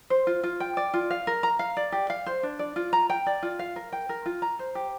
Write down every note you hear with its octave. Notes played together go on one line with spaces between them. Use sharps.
C5
F4
F4
G5
D5
F4
F5
A#4
A#5
F5
D5
G4
F5
C5
D4
D5
F4
A#5
G5
D5
F4
F5
A#4
G5
A#4
F4
A#5
C5
G4